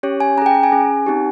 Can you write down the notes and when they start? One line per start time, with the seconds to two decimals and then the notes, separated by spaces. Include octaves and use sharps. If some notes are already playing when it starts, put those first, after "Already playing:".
0.03 C#4 G4 C#5
0.20 G#5
0.38 C#4 A#5
0.42 G#4 G5
0.55 A#5
0.63 G#5
0.72 C#4 G#4
1.06 C4 D#4 G4